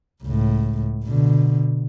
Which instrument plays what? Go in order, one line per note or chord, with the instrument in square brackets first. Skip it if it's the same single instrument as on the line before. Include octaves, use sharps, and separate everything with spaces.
[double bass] C#2 A2
B2 D3